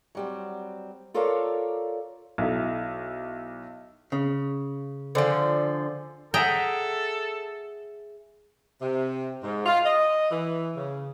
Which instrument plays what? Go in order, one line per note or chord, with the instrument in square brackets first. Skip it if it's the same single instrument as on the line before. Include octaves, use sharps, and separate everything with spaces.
[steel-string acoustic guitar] F#3 G3 C4
F4 A4 A#4 C#5 D5 F5
[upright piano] B1 E4
[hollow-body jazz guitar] C#3
[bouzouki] D3 F3 [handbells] C5 D5 G#5
[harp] G#4 E5 F#5 [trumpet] A4 [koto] G5 A#5
[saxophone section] C3
G#2
F4
D#5
E3
C#3